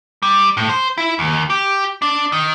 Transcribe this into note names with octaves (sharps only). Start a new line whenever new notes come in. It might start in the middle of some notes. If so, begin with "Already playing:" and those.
G3
A2
C5
E4
D#2
G4
D4
D#3